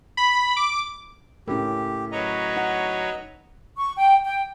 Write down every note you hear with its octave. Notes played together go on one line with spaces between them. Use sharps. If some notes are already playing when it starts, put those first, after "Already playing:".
B5
D6
A2 C#4 G4 A#4
F#3 B4 C#5 D#5 A#5
D#4 F#5
C#6
G5
G5